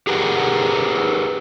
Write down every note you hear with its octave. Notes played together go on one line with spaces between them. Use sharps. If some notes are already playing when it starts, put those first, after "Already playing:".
G4 G#4 A#4 B4 F#5